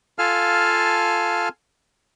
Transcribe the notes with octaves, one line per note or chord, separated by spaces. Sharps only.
F4 A4 F5 G#5 A5 F6